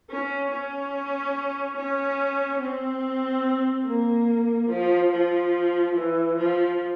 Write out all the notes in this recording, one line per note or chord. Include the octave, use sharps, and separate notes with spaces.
C#4
C#4
C#4
C4
A#3
F3
F3
E3
F3